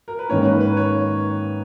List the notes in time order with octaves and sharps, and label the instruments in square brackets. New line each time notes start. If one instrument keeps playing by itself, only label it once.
[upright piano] A#4
B4
[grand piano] G#2 D#3 A#3 C#4 [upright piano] C#5
[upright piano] C#5
B4
B4
C#5